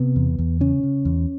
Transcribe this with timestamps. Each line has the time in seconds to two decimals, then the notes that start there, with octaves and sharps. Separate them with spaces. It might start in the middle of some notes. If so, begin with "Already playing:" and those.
Already playing: C3 B3
0.16 E2
0.38 E2
0.60 C#3 C#4
0.83 C#3
1.05 E2